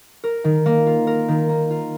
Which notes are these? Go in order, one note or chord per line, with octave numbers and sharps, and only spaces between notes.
A#4
D#3
A#3
F4
A#4
D#3
A#3
F4